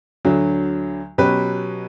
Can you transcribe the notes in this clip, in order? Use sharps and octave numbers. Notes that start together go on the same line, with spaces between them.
D2 D3 F#3
B2 F#3 C#4 G4 B4